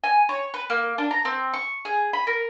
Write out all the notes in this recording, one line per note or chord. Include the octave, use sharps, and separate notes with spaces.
G#5
C#5
B4
A#3
D4
A#5
C4
C#6
G#4
B5
A#4